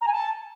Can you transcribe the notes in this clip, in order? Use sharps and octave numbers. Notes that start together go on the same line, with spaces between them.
A#5
G#5
A5